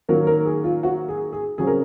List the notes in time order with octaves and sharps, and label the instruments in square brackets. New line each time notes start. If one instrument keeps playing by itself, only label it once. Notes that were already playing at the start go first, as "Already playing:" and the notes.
[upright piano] D#3 F#3 A#3 A#4
A#4
G#4
F4
F#4
G#4
G#4
C#3 F#3 C4 G#4
A#4